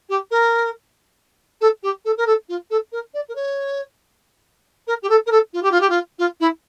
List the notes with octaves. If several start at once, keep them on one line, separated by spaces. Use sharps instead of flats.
G4
A#4
A4
G4
A4
A#4
A4
F4
A4
A#4
D5
A#4
C#5
A#4
G4
A4
A#4
A4
F4
G4
F4
G4
F4
F4
E4